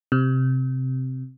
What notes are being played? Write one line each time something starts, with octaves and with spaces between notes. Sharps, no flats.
C3